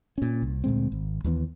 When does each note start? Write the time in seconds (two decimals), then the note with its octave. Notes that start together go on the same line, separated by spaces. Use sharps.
0.18 A#2 C#4
0.42 C2
0.64 D2 A#2 G#3 C4
0.92 G#1
1.24 D#2 E3 A#3 B3